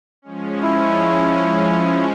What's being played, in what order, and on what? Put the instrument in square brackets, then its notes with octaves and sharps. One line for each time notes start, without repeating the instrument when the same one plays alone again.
[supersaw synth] F3 G#3 C#4
[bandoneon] E4